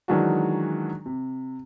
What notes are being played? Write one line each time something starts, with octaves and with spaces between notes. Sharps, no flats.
D#3 E3 F#3 G#3 D4 F#4
C3